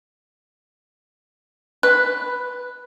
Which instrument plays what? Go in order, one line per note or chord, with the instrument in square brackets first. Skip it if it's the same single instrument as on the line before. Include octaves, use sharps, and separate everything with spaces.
[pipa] B4 [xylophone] F#6